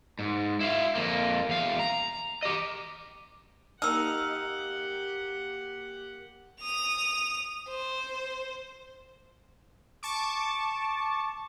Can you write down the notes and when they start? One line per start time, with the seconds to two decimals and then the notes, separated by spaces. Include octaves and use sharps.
0.19 G#2
0.61 E4 F5
0.95 F2 A#3
1.49 E2 F5
1.80 A#5
2.43 G4 D#5
3.82 A#3 D#4 G4 F#5 E6 F6
6.61 D#6 F7
7.69 C5
10.03 A5 C#6 D6